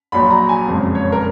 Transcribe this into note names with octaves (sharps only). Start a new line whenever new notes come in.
A#1 A#2 F#3 B5
A#5
G#5
F#1 F2 F3 G#3
C#5
A#4